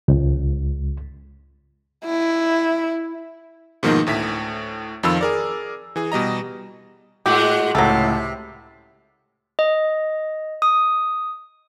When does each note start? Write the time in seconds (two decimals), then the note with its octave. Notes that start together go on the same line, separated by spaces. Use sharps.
0.08 C#2
2.05 E4
3.83 G#2 B2 D#3 F3 A#3 D#4
4.07 D2 A2 E5 B6
5.03 F2 D#3 F3 F4 B5 E6
5.21 G#4 A#4 D5
5.96 E3 G#4
6.12 B2 G3 D#5 A#5
7.26 A2 G#3 F#4 G4
7.75 C#2 A2 C3 F#3 A4
9.59 D#5
10.62 D#6